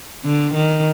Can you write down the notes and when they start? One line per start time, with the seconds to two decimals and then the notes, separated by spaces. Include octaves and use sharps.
0.25 D3
0.54 D#3